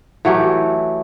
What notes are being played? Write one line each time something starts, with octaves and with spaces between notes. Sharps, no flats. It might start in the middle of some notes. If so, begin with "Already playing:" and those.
E3 F#3 A3 G4